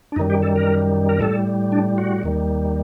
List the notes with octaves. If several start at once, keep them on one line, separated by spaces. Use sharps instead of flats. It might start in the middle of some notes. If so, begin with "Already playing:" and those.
D4
F#2 D#3 G3 D#4
G4
A4
A#4
A#4
A2 G3 A4
D4
F#4
D#2 D#3 G3